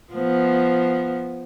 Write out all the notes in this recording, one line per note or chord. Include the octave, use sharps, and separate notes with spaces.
F3 B3